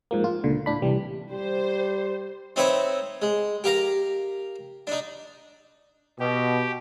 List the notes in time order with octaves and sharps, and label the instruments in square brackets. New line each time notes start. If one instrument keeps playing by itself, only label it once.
[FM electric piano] G#2 F3 A#3
F4
C#2 A#2 D3
A2 D4 B5
C2 E3 G3
[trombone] G3 [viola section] C5
[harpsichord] C4 D#4 B4 C#5 E5
G#3
G4 A#4 F5 A#5
D4 D#4
[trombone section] B2 [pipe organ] G4